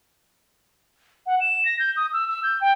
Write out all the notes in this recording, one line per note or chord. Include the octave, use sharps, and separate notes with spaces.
F#5
E7
A#6
G6
D#6
E6
E6
G6
G5